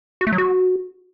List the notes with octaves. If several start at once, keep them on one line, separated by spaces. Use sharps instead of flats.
F#4
A3
F#3
F#4